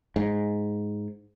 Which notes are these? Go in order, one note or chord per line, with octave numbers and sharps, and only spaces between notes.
G#2